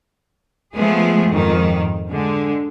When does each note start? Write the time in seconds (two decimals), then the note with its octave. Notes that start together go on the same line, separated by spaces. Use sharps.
0.74 F3 G#3 A3 B3 G#4
1.29 F2 G#2 D#3
2.10 D3 G#3